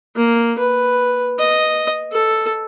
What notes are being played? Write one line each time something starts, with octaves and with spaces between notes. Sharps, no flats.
A#3
B4
D#5
A4